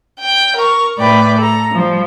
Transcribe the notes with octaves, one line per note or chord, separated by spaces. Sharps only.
G5
A#4 C#6
A2 B4 D5 G5
A4 A#5
F3 G3